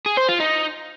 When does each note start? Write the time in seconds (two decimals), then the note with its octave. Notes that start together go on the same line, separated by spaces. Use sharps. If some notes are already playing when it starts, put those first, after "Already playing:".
0.06 G#4
0.17 C5
0.29 F4
0.40 D#4